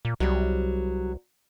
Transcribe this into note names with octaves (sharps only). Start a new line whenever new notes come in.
A#2
C2 F#3 G3